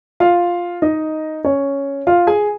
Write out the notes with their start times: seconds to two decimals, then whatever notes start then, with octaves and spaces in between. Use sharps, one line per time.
0.20 F4 F5
0.82 D#4 D#5
1.44 C#4 C#5
2.07 F4 F5
2.27 G#4 G#5